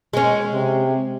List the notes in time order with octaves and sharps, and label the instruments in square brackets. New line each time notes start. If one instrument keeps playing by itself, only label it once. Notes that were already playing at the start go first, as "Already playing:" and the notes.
[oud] G#3 C#4
[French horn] C3